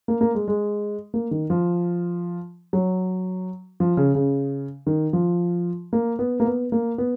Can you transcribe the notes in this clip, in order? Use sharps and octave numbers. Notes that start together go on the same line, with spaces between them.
A#3
A#3
G#3
G#3
A#3
D#3
F3
F#3
F3
C#3
C#3
D#3
F3
A#3
B3
A#3
B3
A#3
B3